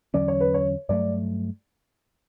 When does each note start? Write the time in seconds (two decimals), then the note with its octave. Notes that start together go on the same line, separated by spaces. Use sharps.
0.14 E2 D3 F#3 C#4 D5
0.28 C#5
0.40 B4
0.54 C#5
0.89 G2 F#3 A3 D5